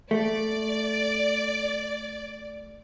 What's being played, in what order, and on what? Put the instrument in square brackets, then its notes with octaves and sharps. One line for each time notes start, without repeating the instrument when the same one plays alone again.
[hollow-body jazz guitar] A3 [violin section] D5